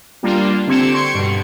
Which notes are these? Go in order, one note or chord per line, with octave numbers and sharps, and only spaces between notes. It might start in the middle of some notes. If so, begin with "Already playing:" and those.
G3 A#3 D4 F4
D3 C4 G4 G#6 C#7 E7
C6 C#6 G#6 C#7 D7
G2 B2